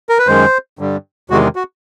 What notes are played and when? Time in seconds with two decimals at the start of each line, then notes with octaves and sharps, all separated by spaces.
0.09 A#4
0.19 B4
0.27 F#2 D#3 G#3 C5
0.79 G2 D3 G3
1.30 E2 C3 D#3 G#3 F#4
1.56 F#4